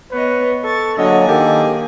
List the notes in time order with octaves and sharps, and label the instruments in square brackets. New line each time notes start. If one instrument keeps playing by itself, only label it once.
[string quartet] B3 C#5 D#5 [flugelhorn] B4
[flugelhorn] A4 [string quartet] C#6 A6
[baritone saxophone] D3 [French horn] F#3 [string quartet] A#3 G#4 G#5 [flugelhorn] D#5
[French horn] D#3 [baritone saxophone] G4 [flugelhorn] A4